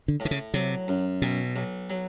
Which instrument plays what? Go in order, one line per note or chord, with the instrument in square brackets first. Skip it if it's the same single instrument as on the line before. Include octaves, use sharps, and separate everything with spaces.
[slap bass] D3
[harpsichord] A2
[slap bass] D3
C#3
[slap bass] C3 [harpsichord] F#3
[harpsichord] F#2
[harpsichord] B1 [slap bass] B2
[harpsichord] B1
F#3